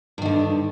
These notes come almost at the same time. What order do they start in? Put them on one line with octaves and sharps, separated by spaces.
G2 D#3 D3